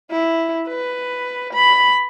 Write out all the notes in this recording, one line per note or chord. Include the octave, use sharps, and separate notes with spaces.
E4
B4
B5